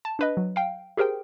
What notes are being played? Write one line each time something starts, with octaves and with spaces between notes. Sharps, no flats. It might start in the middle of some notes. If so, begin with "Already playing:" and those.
A5
D4 B4 D#5
F#3
F5 G5
G4 G#4 A#4 C5 G5